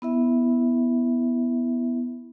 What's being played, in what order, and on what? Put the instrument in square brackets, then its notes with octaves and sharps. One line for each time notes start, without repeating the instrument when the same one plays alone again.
[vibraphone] B3 E4 E5